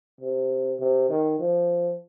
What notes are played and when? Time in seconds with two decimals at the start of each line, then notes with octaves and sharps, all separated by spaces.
0.21 C3
0.79 C3
1.09 D#3
1.39 F3